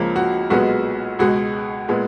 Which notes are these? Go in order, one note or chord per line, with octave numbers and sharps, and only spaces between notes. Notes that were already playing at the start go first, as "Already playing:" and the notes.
Already playing: C#2 C#3 F3 A#3
F#4
B1 A#2 G#3 B3 F#4
C#2 B2 G#3 F#4
A#2 G#3 B3